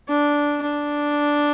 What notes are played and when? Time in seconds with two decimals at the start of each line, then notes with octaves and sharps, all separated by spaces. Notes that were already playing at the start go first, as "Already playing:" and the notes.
0.08 D4
0.62 D4